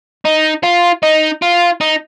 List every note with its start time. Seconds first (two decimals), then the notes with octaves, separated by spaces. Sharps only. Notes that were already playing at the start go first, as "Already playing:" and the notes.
0.25 D#4
0.63 F4
1.03 D#4
1.42 F4
1.81 D#4